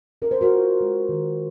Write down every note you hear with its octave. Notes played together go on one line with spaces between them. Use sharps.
C#4 A#4
C5
F#4 A#4
F4
G#3
D#3